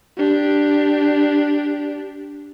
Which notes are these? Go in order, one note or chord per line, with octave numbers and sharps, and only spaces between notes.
D4 G4